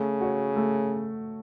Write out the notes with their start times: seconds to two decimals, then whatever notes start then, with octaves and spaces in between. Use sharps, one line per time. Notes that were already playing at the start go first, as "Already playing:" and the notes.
Already playing: C#3 A3
0.21 F#4 C#5
0.56 A3